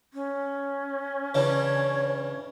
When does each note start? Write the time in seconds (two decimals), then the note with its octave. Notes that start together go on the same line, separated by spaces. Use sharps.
0.14 C#4
1.35 C#3 E3 D4 C#5